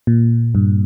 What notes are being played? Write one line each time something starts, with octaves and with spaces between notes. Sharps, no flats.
A#2
G2